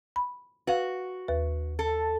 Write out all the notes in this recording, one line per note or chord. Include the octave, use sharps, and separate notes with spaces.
B5
F#4 B4 F5
D#2 B4
A4